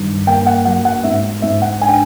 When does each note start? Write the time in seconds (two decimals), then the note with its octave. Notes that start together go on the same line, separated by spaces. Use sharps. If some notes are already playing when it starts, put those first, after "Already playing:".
Already playing: G2 D#3
0.27 A#3 G5
0.47 F#5
0.65 F#3 F#5
0.85 F#5
1.04 G#2 E5
1.42 G#2 E5
1.62 F#5
1.81 D4 G#5
1.89 G5